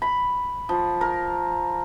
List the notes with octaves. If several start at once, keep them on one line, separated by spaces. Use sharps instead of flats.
B5
F3
A#4